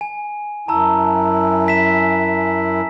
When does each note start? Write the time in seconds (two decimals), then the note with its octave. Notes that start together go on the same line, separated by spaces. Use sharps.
0.01 G#5
0.68 F#2 E4 A5 A#5 E6
1.67 G#5 B6 E7